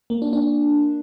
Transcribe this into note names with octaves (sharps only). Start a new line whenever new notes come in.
A#3
D4
D4